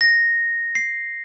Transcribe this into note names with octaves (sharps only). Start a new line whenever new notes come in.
A#6
C7